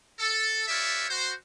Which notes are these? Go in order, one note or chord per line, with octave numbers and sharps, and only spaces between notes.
A4
F4 G4 B4 C#5 D5 E5
F#4 C5